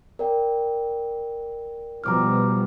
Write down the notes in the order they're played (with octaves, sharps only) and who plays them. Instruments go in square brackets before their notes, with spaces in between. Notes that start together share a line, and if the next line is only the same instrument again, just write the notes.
[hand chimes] A#4 D5 G5
[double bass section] B2 F3 G3 [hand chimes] A#5 D6 F6